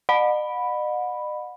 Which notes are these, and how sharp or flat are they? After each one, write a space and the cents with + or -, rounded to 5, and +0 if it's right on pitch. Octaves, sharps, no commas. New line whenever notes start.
D#5 -45 F#5 -35 B5 +0